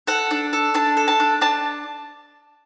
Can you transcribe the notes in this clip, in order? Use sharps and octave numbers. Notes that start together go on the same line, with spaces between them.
A4 F#5
D4
A4
D4 A5
A4
A5
D4
D4 A5